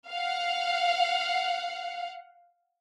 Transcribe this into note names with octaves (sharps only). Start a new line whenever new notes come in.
F5 F#5